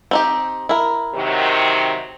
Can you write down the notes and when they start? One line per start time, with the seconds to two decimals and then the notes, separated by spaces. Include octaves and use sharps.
0.11 C4 D#4 G4
0.69 E4 A#4
1.14 C3 D#3 F#3